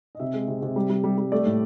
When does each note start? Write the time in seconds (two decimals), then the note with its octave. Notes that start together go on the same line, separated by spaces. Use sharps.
0.15 D#5
0.20 C3 E5
0.34 G#3
0.48 C3
0.62 C3
0.76 G3
0.90 G3
1.04 G3
1.18 G3
1.32 A3 D5
1.46 A2